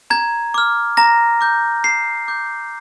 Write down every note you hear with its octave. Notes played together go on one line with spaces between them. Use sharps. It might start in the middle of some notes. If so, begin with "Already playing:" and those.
A#5 G#6
D6 F6
A#5 A#6
D6 G6
A#5 C7
D6 G6